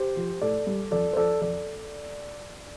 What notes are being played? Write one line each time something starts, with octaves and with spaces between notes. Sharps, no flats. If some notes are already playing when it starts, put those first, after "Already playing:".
Already playing: G4 C5
F3
A2 A4 D5
G3
F2 A4 D5
C5
F3 A4 D5
F2 A4 D5